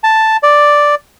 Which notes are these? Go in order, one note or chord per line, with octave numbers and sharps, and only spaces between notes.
A5
D5